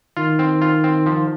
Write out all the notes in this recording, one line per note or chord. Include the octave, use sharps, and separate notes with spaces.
D#3 F4
C4
F4
C4
F3